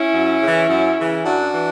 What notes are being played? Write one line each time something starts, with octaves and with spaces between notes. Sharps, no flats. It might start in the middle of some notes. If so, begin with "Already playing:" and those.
Already playing: C#4 E4
F#2
C#3 E3
F#2
C#3 E3
F#2 D4 F#4
E3